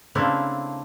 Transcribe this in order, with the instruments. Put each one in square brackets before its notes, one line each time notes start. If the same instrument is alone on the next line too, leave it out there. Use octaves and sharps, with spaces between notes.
[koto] C#3 A3 A#3 C4 D4 E4